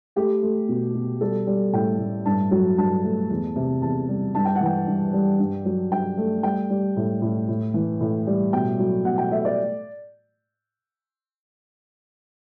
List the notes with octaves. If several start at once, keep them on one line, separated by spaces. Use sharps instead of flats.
A3 G4
A3
B2
B2
G3 A4
G3
A2 G5
A2
G2 A5
F#3
G2 A5
A3
E2
C3
E2 A5
G3
G2 A5
G5
F#5
E3
G5
G2
G3
G2
F#3
G2 G5
A3
G3 G5
G3
A2
A2
A2
E3
A2
G3
B2 G5
F#3
B2 F#5
G5
A3 E5
D5